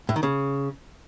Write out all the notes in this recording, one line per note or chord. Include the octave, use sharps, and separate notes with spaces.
A2
D#3
C#3